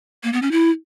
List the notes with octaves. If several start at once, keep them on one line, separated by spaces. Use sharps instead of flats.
A#3
B3
C#4
E4